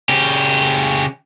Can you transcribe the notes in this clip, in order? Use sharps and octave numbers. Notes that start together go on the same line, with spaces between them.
C#3 G4